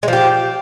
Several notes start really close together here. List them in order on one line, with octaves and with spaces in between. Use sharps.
G#3 F3 G4